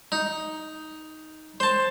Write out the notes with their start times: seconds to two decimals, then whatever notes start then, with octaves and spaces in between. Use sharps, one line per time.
0.12 D#4
1.60 C5 A5